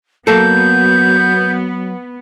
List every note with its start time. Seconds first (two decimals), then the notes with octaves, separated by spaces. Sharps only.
0.27 F#3 A#3 B3 A4 G6